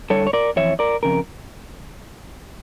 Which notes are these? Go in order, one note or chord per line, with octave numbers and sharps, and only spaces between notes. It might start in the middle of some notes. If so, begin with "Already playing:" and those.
G2 D3 A4 C#5
C#5
A#4 D5
F2 E3 C#5 E5
A#4 D5
F2 C#3 A#4